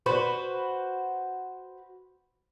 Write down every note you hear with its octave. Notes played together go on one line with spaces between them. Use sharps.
F#4 B4 C5